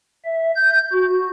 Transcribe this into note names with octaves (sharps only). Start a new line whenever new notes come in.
E5
G6
F#4